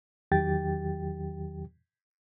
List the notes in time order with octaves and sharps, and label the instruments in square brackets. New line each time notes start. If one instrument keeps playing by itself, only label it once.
[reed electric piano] E2 D#3 F#3 G4 G5 A6